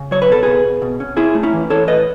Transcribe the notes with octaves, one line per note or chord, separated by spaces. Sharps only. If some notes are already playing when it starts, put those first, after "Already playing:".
Already playing: C#3
F#3 C#5
B4
B2 A4
B2 G#4 B4
B2
B2
C#4
C#4 E4 G#4
A3
C#4 E4
E3
C#4 A4 C#5
A2 B4 D#5